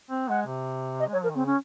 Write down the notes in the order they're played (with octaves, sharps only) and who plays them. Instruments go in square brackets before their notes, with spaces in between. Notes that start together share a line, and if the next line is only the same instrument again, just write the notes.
[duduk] C4
[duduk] G#3 [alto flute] F#5
[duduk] C3
[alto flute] D#5
[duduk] G#3
[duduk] F#3 [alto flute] C#5
[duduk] F3 [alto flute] A#4
[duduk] D#3
[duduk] C#3 [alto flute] C4
[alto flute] C#4